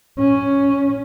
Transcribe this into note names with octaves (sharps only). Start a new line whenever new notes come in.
C#4